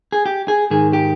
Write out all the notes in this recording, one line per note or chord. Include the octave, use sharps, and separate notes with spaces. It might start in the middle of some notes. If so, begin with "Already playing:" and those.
G#4
G4
G#4
G#2 D#3 G#4
G4